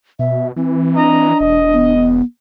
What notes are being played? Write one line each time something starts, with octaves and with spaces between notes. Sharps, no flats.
B2 E5
E3 C4
D4 D#5 A#5
E1 D#5
B3